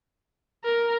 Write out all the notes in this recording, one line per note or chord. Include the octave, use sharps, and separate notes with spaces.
A#4